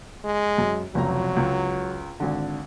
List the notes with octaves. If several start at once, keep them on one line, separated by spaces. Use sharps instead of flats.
G#3
F#2
F1 C#2 F#3 A#5
C#2
G#1 D3